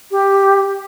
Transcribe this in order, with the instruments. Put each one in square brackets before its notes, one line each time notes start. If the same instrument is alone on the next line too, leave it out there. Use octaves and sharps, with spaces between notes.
[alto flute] G4